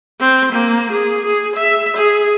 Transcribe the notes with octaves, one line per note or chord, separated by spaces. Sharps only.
C4
A#3
G#4
G#4
E5
G#4